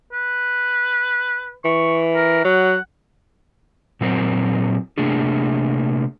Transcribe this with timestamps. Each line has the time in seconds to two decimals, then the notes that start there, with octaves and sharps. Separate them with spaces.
0.13 B4
1.64 E3 C#6
2.15 A#4
2.45 F#3 F#5
4.01 A#2 F#3 C4 A#4 C5
4.98 C3 A3 A#3 D4 G#4